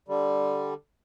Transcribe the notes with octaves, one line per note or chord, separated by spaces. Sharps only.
D3 G3